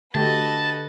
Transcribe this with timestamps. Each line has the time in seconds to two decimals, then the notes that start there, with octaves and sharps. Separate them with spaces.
0.15 D3 A3 F#4 G4 A4 B4 D#5 A5